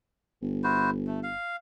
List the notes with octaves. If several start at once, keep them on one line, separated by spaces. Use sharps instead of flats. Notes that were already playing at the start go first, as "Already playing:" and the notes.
G1
E4 F#4 C5
A3
F5